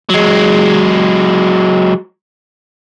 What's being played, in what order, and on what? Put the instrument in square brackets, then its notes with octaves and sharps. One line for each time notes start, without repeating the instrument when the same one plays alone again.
[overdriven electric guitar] F#3 G#3